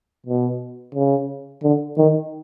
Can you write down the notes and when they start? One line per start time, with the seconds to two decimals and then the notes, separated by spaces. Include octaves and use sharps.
0.26 B2
0.95 C#3
1.63 D3
1.98 D#3